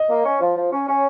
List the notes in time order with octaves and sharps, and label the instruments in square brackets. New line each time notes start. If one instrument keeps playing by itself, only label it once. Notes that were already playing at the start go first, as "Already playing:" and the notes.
Already playing: [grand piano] D#5
[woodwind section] A#3
C#4
F3
F3
C#4
C#4